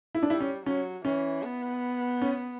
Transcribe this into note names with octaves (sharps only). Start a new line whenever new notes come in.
E4
D4
G3 E4
C#4
F#3 C#4
E3 C#4
B3
C#4